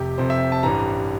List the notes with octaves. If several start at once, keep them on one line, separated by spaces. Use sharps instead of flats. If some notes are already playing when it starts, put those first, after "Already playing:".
Already playing: F1 F2 C3 G4
F1 F2 C3 C5
E5
A5
A1 G2 E3 G3 A#5